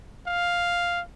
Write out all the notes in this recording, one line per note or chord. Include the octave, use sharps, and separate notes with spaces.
F5